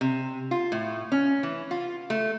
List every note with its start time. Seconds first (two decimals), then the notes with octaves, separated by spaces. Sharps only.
0.01 C3
0.51 F4
0.72 A2
1.12 C#4
1.43 E3
1.71 F4
2.10 A3